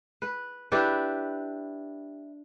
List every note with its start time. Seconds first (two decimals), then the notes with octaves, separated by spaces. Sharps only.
0.22 B4
0.72 D4 E4 G4 B4